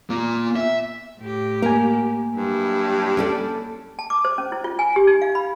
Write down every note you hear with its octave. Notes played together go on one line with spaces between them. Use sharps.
A#3 F4
E5
A2 G4
A#3 A#4 G#5
G2 F#3 E4
C#4 A4 D5
A5
D6
C5
C#4
E4
F4
G#5
G4
D#4
F5
B5